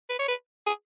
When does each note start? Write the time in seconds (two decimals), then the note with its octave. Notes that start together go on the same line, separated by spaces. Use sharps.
0.09 B4
0.19 C#5
0.28 B4
0.66 G#4